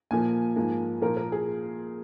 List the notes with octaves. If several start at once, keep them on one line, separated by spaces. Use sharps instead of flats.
A#2 F3 A#3 G#5
G#2 F3 A#3
A#2 F3 A#3 A#4
A#4
G#4